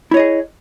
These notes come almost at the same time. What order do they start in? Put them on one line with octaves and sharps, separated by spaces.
E4 C#5 D#5 G#4